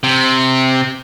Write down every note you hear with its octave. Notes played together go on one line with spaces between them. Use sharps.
C3